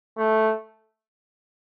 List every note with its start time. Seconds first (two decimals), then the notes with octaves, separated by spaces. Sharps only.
0.18 A3